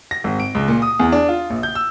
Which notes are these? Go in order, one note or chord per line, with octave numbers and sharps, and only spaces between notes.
A#6
G#1
D7
C#2
A#2
D#6
E2
D4
F4
A#1
G6
E6